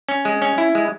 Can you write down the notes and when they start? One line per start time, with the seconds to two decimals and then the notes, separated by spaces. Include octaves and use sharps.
0.09 C#4
0.25 G#3
0.42 C#4
0.58 E4
0.75 G#3